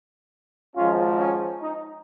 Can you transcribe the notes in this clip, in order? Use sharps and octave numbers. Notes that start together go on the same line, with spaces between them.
G#1 G#2 F3 G#3 C#4 F4
C#4
D#4